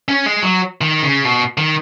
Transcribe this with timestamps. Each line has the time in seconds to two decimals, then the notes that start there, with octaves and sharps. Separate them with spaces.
0.08 C#4
0.26 G#3
0.43 F#3
0.81 D#3
1.03 C#3
1.25 B2
1.58 D#3